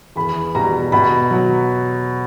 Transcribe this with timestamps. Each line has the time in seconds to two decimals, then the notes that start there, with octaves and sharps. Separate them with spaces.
0.16 E2 B5
0.55 B2 G3 A#5
0.92 B2 B5
1.31 F#3